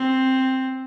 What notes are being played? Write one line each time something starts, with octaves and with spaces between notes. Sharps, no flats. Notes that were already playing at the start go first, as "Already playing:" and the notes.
Already playing: C4